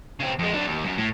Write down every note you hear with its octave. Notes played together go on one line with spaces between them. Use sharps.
C#3 C4
F2 G#3
F#3 D4
D#2
F#2
A2